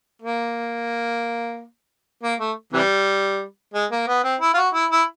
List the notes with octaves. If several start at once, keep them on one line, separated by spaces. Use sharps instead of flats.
A#3
A#3
A3
C3 E3 G3
G#3
A#3
B3
C4
E4
F4
F#4
E4
E4